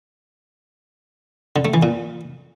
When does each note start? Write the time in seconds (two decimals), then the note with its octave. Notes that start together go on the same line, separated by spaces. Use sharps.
1.56 D3
1.65 A3
1.74 E3
1.83 A#2